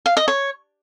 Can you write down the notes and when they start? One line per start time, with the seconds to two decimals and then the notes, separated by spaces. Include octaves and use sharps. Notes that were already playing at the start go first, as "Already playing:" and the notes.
0.06 F5
0.17 D#5
0.28 C#5